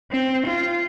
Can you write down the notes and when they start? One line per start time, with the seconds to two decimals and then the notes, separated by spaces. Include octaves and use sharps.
0.11 C4
0.47 F4